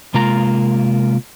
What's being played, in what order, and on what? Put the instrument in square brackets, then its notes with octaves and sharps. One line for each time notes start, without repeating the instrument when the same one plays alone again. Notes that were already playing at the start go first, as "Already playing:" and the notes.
[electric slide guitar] C3 G#3 A#3 F4 A#5